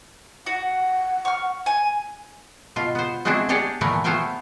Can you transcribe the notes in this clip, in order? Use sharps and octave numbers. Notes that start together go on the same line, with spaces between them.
F#4 F#5
C#6 F6
G#5
B2 F4
B3 C5
G#3 A3 B3 C4 D4 E4
D4 G4 G#4 C#5 D5
A#2 E3 A3 B3 A#4 B4
A3 B3 C5 F5 G5 G#5